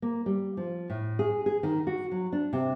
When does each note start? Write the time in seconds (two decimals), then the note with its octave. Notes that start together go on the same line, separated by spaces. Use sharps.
0.02 A#3
0.26 G3
0.57 F3
0.90 A2
1.19 G#4
1.46 G#4
1.63 D#3
1.87 F#4
2.11 F#3
2.33 D4
2.53 C3